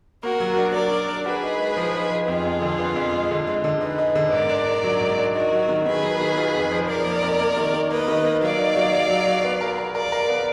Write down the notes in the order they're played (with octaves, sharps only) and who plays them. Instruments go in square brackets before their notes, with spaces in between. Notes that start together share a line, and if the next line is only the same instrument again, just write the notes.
[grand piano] A#3 [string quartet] F#4 A#4
[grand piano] F#3
D4
[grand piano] F#3 [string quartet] A#4 D5
[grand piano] D4
D4
[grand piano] F#4 [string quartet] G#4 B4
[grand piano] D#4
G#3
F3
D#4
F3
[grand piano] F2 [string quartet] F4 G#4
[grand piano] F2
D3
B3
F2
G#3
D3
G#3
D3
[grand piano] D#4 [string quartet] G#4 B4
[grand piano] D#4
D3
[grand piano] G#2 [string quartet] A#4 D5
[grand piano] D4
D4
F#3
G#2
D4
[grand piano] D#4 [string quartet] F#4 A#4
[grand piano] F#3
D#3
[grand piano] D#3 [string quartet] G#4 B4
[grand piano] F#3
D#3
F4
F2
F3
[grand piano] F3 [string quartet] A#4 D5
[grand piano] A#3
F2
A#3
D#3
D#3
[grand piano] A#3 [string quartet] B4 D#5
[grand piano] D#3
A#3
[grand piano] F#3 [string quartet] D5 F5
[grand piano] D#4
F#3
F#3
F#3
F#3
B3
A#4
A#4
[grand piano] A#4 [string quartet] D5 F5
[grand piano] A#4
B3